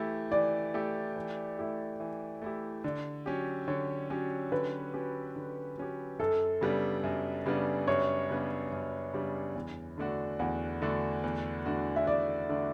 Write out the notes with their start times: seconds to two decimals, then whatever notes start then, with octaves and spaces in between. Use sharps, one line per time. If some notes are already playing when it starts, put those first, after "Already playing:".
Already playing: E3 A3 E4 G4
0.32 E3 D5
0.74 A3 E4 G4
1.16 E3
1.58 A3 E4 G4
2.00 E3
2.42 A3 E4 G4
2.84 D3 D5
3.26 F#3 C#4 G4
3.68 D3 C#5
4.10 F#3 C#4 G4
4.52 D3 B4
4.93 F#3 C#4 G4
5.36 D3
5.77 F#3 C#4 G4
6.19 F#2 A4
6.61 C#3 G3 B3 D4
7.04 F#2
7.46 C#3 G3 B3 D4
7.87 F#2 C#5
8.29 C#3 G3 B3 D4
8.72 F#2
9.13 C#3 G3 B3 D4
9.55 E2
9.98 D3 A3 D4 F#4
10.39 E2 F#5
10.82 D3 A3 D4 F#4
11.23 E2
11.66 D3 A3 D4 F#4
11.96 E5
12.07 E2 D5
12.49 D3 A3 D4 F#4